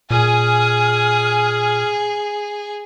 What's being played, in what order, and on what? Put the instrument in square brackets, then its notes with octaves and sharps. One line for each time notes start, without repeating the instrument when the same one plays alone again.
[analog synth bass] A#2 [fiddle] G#4 [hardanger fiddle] G#5 D#6 [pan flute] F6